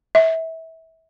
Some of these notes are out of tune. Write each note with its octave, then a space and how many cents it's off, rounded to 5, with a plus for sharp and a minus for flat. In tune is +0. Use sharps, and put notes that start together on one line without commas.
E5 -25